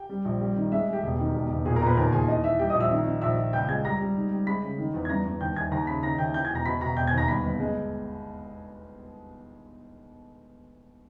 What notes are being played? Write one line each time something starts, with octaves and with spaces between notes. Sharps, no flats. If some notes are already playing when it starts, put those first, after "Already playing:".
Already playing: G4 G5
G3
A#1
G3
D#3
G#3 E5
G#3
G4 G5
E1
D#3
E1
E1
A#2 G#4 G#5
A#4 A#5
A#2
B4 B5
D#2 A#4 A#5
D#2 G#4 G#5
E3 D#5
E3 E5
G3 G4 G5
D#5 D#6
A#1
E5 E6
D#3
D#3
A#1 E5 E6
A#1
C#2 G5 G6
G#3 G#5 G#6
G3 A#5 A#6
G3
G#2
G3
G#3 B5 B6
C#3
D#3
E2
G#6
G2 A#5 A#6
G2
D#2 G5 G6
D#2 G#5 G#6
D#2 A#5 A#6
C#3 B5 B6
D#3 A#5 A#6
D#2 G5 G6
E3 G5 G6
G#5 G#6
E1 A#5 A#6
B2 B5 B6
B2 A#5 A#6
E1 G5 G6
G#5 G#6
D#2 A#5 A#6
G1 B5 B6
G1
G#3